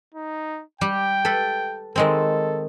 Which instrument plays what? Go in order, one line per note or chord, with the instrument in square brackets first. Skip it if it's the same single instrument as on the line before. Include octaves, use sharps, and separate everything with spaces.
[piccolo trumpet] D#4
[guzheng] G3 G4 [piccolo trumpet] G5
[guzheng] A4 B4 B5
[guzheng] D#3 G#3 C4 [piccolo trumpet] A4